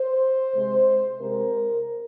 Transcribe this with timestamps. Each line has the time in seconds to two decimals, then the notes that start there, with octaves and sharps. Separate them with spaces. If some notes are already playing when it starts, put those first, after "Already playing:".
Already playing: C5
0.53 C3 G#3
1.19 C3 G#3 A#4